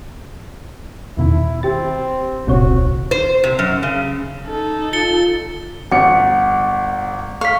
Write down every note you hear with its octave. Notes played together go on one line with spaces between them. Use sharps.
E2 B2 D#3 E4
C4 G4 A6
D#1 C2 A#2 C4 F#4 C#5
C5
C3
F#2
C#3
D#4 A4
F4 A6 C#7 G7
G1 F#5 C#7
F5 C#6 B6